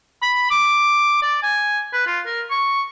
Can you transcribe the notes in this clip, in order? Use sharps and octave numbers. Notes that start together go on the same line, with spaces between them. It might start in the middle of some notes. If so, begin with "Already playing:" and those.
B5
D6
D5
G#5
B4
F4
A#4
C#6